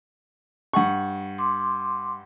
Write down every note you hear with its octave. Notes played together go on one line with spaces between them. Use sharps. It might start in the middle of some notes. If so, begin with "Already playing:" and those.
G2 F#5 C#6
C6 D6